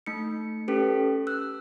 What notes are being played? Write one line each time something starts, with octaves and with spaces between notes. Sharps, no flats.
A3 D#4 C#7
C#4 G4 A4 B4
E6 F#6